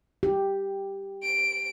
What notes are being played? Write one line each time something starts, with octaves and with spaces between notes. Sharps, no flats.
G4
D7